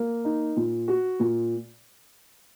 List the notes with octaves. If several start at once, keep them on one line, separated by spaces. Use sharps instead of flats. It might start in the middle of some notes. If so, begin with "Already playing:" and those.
Already playing: A#3
D#4
A#2
F#4
A#2